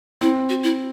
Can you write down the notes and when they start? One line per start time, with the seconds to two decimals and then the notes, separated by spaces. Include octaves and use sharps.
0.21 C4 E4
0.49 F#4
0.63 E4